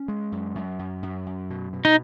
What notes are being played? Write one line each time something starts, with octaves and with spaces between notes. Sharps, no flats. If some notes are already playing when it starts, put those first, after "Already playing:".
Already playing: C#4
G#3
F#2
F#2
F#2
F#2
F#2
B2
B2
D#4